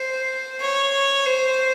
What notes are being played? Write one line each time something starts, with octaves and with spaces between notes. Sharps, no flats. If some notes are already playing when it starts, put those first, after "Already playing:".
Already playing: C5
C#5
C5